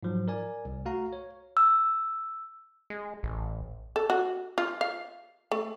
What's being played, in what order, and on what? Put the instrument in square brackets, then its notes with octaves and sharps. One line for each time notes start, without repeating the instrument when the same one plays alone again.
[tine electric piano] G#2 F3 F#3
A#4 D5 G#5
C2
A3 F#4 F5 A#5
C#5
[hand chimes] E6
[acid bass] G#3
A1
[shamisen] A4
F#4
F4
F5
A3